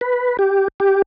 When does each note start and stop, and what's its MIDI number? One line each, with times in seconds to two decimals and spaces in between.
0.01 0.37 71
0.39 0.68 67
0.80 1.02 67